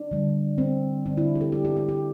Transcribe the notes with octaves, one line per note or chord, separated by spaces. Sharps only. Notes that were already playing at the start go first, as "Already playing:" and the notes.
Already playing: D4
D3 G3
C4
D3 G3 D4
E4
G4
A4
G4
G4
G4
G4